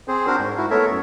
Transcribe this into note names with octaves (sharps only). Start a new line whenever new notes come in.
C4 G#4 C5
D4 F#4 A#4 C5
G#2
E4 F#4
A3 B3 A4 A#4 C#5 E5
F#2